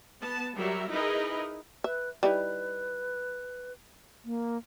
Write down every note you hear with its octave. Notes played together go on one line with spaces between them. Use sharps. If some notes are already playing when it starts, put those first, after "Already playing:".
B3 A5
F#3 G3 A#4 E5
D#4 E4 G#4 A#4 B4 D#5
B4 E5
G3 D#4 E4 B4
A#3